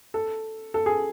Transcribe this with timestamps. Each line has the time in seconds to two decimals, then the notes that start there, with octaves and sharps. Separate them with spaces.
0.14 A4
0.74 A4
0.86 G#4